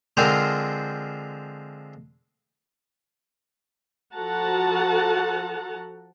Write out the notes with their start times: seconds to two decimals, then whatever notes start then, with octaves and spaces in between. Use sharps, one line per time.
0.17 D3 F3 G#3 C4 A#4 C5
4.14 F3 F#4 A4 F#5 A5 A#5